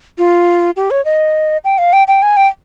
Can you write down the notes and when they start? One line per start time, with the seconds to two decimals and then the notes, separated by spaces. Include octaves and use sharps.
0.18 F4
0.76 G4
0.91 C#5
1.05 D#5
1.64 G5
1.78 F5
1.93 G5
2.08 G5
2.22 G#5
2.37 G5